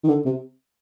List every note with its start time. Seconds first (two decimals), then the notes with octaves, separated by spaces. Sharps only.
0.04 D#3
0.08 D3
0.26 C3